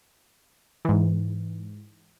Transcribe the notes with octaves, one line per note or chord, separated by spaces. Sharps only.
G#2 E3